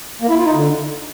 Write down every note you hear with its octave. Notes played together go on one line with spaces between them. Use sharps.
A#3
E4
F4
D#4
D3